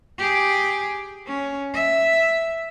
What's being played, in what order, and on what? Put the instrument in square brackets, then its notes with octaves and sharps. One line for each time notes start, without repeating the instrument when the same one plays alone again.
[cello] G4 G#4
C#4
E5